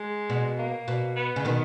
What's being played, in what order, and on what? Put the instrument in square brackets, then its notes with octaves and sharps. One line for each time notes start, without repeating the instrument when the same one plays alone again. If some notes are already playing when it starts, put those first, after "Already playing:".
Already playing: [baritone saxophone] G#3
[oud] B2
[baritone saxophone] A#3
[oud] B2
[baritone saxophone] B3
[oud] C#3
B2 D#3